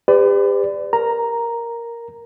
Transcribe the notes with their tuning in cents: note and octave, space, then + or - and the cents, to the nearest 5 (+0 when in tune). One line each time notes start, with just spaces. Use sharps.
G4 +35 B4 +40 D5 +0
A#4 +0 A#5 +0